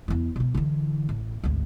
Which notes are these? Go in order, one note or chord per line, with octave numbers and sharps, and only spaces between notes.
E2 E4
B2 F3
D3 E3
A1
G#1 D2